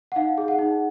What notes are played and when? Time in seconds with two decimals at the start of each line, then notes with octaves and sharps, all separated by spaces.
0.12 F#5
0.16 D#4 F5
0.38 G#4
0.48 F#5
0.59 D#4